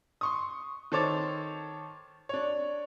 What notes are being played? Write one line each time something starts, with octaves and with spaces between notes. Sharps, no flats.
C6 C#6 D#6
D#3 A4 C5 C#5 D6 A6
D4 C#5